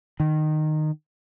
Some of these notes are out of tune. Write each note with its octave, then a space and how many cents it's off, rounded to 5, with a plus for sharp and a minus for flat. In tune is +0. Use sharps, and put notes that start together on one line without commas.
D#3 -15